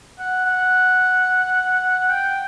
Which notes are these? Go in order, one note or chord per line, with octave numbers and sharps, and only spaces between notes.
F#5
F#5
G5